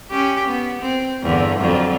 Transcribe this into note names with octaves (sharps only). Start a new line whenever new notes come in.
C#4 G4
B3
C4
E2 G2 D3
F2 D3 F#3